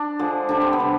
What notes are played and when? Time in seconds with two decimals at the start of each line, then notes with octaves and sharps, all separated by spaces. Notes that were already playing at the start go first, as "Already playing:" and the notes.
Already playing: D4
0.19 D3 F3 G#3
0.49 D3 G3 D4
0.61 C4
0.73 B3
0.79 C3 G3